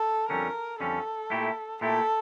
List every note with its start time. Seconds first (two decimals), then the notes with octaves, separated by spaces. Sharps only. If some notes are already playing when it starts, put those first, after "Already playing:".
Already playing: A4
0.29 F2 D3 G3 C#4 A#4
0.80 F2 D3 G3 C#4 A4
1.30 A#2 A3 E4 G4
1.81 A#2 A3 E4 G4 A4